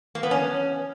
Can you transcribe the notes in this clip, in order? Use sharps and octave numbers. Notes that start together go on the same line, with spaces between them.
A#3
B3
C#4